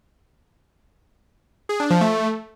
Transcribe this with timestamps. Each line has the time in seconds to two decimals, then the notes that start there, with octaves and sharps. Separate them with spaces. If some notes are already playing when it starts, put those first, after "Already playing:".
1.69 G#4
1.80 D4
1.90 F3
2.01 A3